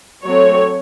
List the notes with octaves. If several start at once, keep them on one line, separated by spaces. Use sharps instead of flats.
F#3 A3 C4 C#5